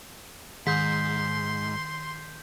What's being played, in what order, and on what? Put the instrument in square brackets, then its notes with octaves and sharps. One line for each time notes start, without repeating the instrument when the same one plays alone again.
[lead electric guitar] G#2 [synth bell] D#3 [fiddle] C6 [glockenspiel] G6 B6